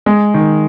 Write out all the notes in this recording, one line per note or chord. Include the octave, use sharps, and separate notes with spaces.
G#3
D#3